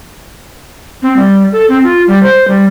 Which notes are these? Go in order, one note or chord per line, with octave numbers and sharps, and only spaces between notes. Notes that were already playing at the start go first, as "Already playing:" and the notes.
C4
G3
A4
C4
F4
G3
C5
G3